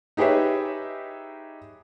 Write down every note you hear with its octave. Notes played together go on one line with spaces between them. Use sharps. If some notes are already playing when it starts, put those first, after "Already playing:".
D#4 G4 G#4 B4 C#5 E5